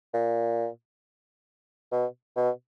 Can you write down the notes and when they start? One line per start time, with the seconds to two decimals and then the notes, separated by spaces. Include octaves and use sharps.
0.14 A#2
1.92 B2
2.36 B2